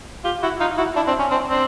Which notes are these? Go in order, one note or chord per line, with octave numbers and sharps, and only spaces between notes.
F4 G4
E4 F#4
D#4 F4
E4 F#4
D4 E4
C4 D4
C#4
C4 D4
C4 D4